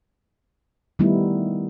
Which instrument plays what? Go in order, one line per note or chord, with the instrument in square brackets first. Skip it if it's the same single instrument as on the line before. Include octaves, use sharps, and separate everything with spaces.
[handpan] D#3 G3 A3 B3 D#4 E4